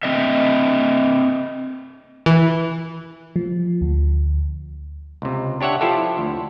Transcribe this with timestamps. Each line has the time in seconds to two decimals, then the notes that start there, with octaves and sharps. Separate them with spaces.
0.03 C4 D#5 E5
2.26 E3
3.36 F3
3.81 D2
5.22 C#2 C3
5.61 D4 G4 C#5 E5 F#5
5.81 F3 E4 F4 G4 A4
6.18 D2